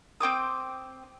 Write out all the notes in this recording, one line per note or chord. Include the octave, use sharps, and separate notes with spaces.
C4 G5 D6 D#6